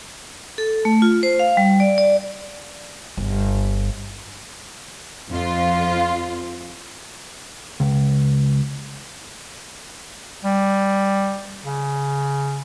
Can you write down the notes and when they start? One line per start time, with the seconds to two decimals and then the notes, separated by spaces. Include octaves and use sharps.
0.58 A4
0.85 A3
1.02 F4
1.23 C5
1.39 F5
1.57 G3
1.80 D5
1.98 D5
3.17 G1
5.30 F2 F4
7.80 C#2
10.45 G3
11.65 C#3